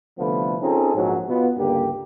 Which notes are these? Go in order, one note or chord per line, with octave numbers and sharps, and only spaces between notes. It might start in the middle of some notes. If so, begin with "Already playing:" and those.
C2 D3 F3 A3 B3 B4
C4 C#4 D#4 F4 G#4 A4
A#1 G#2 F#3
B2 B3 F4
C#2 G2 D3 A#3 G4